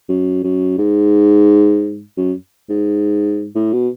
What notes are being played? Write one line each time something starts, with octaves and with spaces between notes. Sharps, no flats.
F#2
F#2
G#2
F#2
G#2
A2
B2